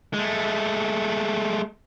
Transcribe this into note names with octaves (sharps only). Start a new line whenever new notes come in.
G#3 A3